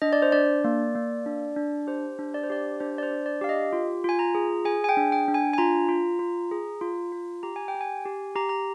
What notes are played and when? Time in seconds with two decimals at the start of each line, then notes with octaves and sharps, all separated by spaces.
0.02 D4 D#5
0.13 D5
0.22 C5
0.32 D4 D5
0.64 A#3
0.95 A#3
1.26 D4
1.56 D4
1.87 G4 C5
2.19 D4
2.34 D5
2.43 C5
2.50 G4 D5
2.80 D4 C5
2.98 D5
3.03 C5
3.11 D4
3.26 D5
3.41 G4 F5
3.49 D#5
3.73 F4
4.04 F4 G#5
4.19 A#5
4.35 G#4
4.65 G#4 G#5
4.84 G#5
4.89 G5
4.97 D4
5.12 G5
5.28 D4
5.34 G#5
5.53 G#5
5.58 F4 A#5
5.88 F4
6.19 F4
6.51 G#4
6.81 F4
7.12 F4
7.43 G4 A#5
7.56 G#5
7.68 G5
7.75 G4
7.81 G#5
8.05 G4
8.36 G4 A#5
8.49 A#5